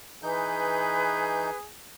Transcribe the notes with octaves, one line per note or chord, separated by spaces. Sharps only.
E3 D#4 G#4 B4 G6